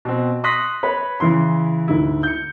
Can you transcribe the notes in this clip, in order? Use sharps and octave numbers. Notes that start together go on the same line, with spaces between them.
B2 C4
C6 C#6 D#6 F#6 A#6 B6
B4 C#5 B5
C#3 E3 E4 C6
D2 G#2 E4
G6 C#7